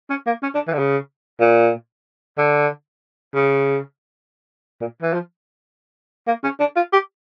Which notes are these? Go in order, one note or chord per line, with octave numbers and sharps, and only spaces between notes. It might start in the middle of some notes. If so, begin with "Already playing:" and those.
C#4
A#3
C#4
D4
E3
D3
C#3
A#2
D3
C#3
A#2
E3
F3
A#3
C#4
D4
F4
G4